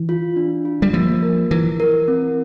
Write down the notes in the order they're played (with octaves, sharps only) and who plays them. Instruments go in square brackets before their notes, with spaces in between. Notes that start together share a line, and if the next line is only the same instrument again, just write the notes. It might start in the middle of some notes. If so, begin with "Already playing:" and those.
Already playing: [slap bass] E3
[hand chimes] F4
D4
F4
[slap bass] G3
[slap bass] F3 [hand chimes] A#3
[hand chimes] A#4
[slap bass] E3 [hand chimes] E4
[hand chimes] A#4
C4